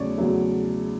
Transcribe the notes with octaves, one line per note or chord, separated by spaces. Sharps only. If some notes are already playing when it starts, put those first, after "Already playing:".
Already playing: E2 C#3 F#3 A3 C#5 D5
E2 C#3 F#3 A3